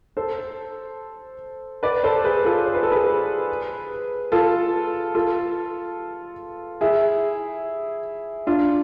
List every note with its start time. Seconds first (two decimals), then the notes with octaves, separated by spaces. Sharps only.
0.17 A4 C5
1.83 B4 D5
2.03 A4 C5
2.24 G#4 B4
2.45 F4 A4
2.66 C5
2.75 B4
2.83 A4
2.92 G#4 B4
4.32 F4 A4
5.15 F4 A4
6.81 E4 G#4
8.47 D4 F4